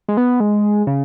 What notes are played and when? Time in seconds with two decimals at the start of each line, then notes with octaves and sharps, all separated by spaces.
0.08 G#3
0.17 B3
0.40 G#3
0.87 C#3